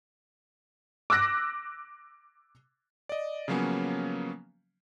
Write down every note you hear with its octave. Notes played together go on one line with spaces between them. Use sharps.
D6 E6 F#6 A#6
D5 D#5
C#3 F3 F#3 A#3 B3 C#4